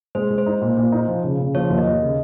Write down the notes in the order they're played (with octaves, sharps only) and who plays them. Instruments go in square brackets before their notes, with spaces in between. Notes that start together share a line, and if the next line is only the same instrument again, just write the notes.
[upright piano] G#3 [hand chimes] C5
[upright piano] G#3
[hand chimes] C5
[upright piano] D#4
A#2
A#2
D#4
F3
C#3
C#3
[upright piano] F3 [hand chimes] C#5
[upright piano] D#2
[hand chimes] D#5
[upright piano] D#2
C#3